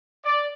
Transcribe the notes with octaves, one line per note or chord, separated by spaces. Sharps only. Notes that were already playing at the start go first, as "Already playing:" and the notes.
D5